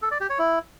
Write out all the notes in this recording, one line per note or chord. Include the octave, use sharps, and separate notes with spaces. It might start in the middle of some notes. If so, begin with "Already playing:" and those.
A4
D5
G4
C#5
E4